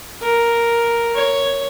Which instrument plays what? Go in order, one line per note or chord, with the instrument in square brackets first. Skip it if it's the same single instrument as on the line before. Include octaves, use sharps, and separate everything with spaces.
[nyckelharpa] A#4
C#5